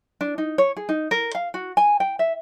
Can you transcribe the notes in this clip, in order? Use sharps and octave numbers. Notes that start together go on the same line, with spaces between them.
D4
D#4
C#5
G#4
D#4
A#4
F5
F#4
G#5
G5
E5